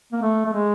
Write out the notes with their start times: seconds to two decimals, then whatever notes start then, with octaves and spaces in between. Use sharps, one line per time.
0.12 A#3
0.22 A3
0.46 A3
0.53 G#3